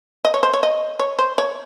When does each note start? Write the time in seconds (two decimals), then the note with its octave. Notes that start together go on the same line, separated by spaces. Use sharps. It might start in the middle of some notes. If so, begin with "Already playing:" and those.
0.25 D#5
0.34 C#5
0.43 C5
0.53 C#5
0.63 D#5
0.99 C#5
1.19 C5
1.38 C#5